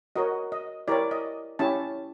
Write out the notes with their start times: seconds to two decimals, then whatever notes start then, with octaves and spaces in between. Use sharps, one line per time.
0.16 F#4 A#4 C#5 D#5
0.52 D#5
0.88 E4 G4 A#4 C#5 D5
1.11 D#5
1.59 C#4 E4 G4 A5